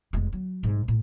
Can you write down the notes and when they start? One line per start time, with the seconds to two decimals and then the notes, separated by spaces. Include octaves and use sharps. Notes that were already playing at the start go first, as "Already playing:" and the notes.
0.13 F1 G#3
0.33 F#3
0.63 C2 G#2
0.88 A2